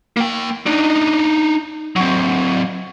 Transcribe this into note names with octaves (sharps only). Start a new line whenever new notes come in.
A#3 G5
D4 D#4
F#3 C4